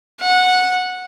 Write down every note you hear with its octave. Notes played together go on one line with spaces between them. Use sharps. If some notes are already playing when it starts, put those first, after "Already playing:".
F#5